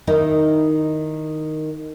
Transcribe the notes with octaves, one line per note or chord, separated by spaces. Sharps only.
D#3 D#4 E4